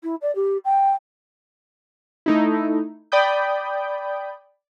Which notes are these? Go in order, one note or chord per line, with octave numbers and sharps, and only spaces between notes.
E4
D5
G4
G5
A3 D#4 E4
D5 G5 B5 D#6 G6